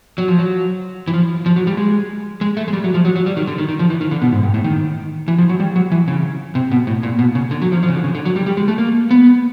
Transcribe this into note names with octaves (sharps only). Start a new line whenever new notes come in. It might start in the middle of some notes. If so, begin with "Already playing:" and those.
F#3
F3
F#3
E3
F3
F3
F#3
G3
G#3
G#3
A3
G#3
G3
F#3
F3
F#3
F#3
G3
D#3
D3
D#3
D#3
F3
E3
D#3
D3
B2
G#2
G2
A2
D#3
E3
F3
F#3
G3
F#3
E3
C#3
C3
B2
A2
A#2
B2
C#3
D3
F#3
F3
F3
C#3
D3
C#3
D3
F#3
G3
G3
G#3
A3
A#3
B3